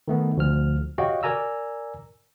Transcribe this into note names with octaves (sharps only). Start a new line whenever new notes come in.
D#3 A3 B3
D2 F3 F6
F#4 G4 C#5 D#5 F5 G5
A#4 D5 G#5 A#5 E6